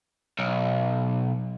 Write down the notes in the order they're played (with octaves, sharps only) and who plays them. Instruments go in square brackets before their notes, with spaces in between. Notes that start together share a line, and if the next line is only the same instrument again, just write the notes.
[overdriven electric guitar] B1